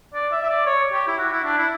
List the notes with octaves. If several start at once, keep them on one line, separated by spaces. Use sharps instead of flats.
D5
E5
E5
D5
C#5
G4
E4
F#4
E4
D4
E4